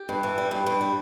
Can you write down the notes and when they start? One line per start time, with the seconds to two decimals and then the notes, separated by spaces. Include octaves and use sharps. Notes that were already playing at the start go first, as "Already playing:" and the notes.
Already playing: G4
0.09 G2
0.23 E3
0.38 G3
0.51 G2
0.66 G2
0.81 G3